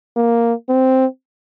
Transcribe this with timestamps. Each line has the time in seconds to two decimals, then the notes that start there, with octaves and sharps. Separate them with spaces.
0.16 A#3
0.69 C4